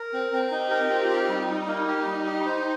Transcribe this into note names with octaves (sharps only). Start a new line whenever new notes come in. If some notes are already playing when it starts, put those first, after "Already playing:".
Already playing: A#4
C4
C4
D#4 G4
A#4
F4
C4
D#4 G4
G3
G3
A#3
G4
G3
D#4 G4
C5